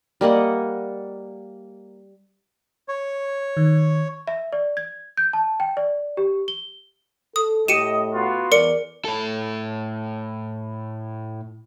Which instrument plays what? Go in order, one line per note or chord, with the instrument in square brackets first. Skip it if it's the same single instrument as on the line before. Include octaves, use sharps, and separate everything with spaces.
[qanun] G3 A#3 D#5 F#5
[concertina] C#5
[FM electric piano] D#3
[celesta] E5
D5
G#6
G6
A5
G5
D5
G4
G7
[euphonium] A4 [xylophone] D#6
[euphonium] A2 [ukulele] G4 [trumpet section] D#5 [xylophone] C#7 D#7 E7
[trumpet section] B3 F4 F#4
[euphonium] E2 [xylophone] A#4 C#7 [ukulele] D5
[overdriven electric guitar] A2 A4